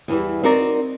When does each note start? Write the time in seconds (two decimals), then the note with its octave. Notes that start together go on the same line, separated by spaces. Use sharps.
0.08 E2 E3 G3
0.43 C4 D#4 F#4 A#4 D5